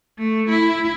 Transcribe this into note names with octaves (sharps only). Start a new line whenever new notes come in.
A3
E4